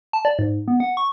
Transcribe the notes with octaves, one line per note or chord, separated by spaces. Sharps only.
A5
D5
G#2
B3
F#5
C#6